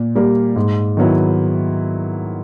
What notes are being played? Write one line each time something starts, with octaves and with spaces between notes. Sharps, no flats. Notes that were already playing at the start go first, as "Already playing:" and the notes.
Already playing: A#2
G3 A#3
G#2
D#3 F#3 B3 E4